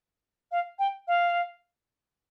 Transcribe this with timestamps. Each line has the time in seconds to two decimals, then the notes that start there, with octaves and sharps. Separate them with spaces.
0.51 F5
0.79 G5
1.07 F5